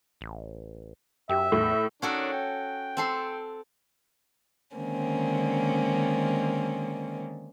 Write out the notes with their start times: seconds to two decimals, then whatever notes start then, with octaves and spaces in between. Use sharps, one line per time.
0.21 A1
1.29 F#2 G4 E5
1.52 E2 A2
2.02 D#3 C#4 D4 F#4 A4
2.32 G5
2.97 C4 A4 C6
4.76 D3 D#3 G#3 A#3 C4 C#4